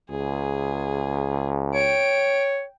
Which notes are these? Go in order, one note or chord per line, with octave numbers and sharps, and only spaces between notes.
C#2 G#4
C#5 G5 D7